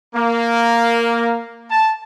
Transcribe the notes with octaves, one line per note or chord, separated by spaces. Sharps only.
A#3
A5